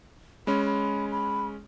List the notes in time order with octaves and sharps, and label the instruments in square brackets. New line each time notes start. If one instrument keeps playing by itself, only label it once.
[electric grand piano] G#3 C#4 [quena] B5
[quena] B5
B5